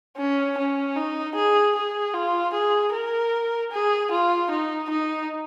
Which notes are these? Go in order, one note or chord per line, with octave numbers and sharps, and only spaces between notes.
C#4
C#4
D#4
G#4
G#4
F4
G#4
A#4
G#4
F4
D#4
D#4